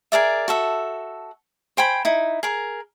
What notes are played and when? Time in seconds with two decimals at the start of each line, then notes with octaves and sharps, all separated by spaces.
0.12 G#4 A#4 D5 E5
0.48 F#4 A4 E5
1.77 C5 G5 G#5 B5
2.05 D#4 E4
2.43 G#4 A#4